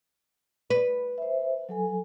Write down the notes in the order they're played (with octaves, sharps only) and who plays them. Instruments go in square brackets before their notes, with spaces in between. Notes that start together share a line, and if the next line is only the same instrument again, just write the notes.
[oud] B4
[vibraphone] C5 E5
F#3 A4 G#5